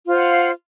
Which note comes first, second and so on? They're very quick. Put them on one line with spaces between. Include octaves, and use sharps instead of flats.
F4 C5 F5 F#5